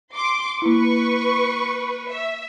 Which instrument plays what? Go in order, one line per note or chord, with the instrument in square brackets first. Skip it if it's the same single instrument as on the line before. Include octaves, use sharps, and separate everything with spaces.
[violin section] C6 D6
[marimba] A#3 E4 [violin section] B4 C#6
[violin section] E5